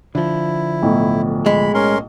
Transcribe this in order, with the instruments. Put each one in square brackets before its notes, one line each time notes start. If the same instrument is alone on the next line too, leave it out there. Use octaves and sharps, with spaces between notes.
[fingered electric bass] D3 F3 [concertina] E4
[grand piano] B1 A2
[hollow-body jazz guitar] G#3 [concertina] B5
[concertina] C#4 A#4 C6